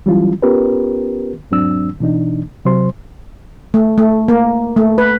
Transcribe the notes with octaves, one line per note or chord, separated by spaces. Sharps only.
E3 F#3 G3 C#4 E4 F4
B3 C#4 F4 G4 A#4 B4
E2 G#2 F#3 C4 D4 E6
B2 E3 D4 D#4
C3 F#3 C5 C6
A3
A3
A#3
A3
B4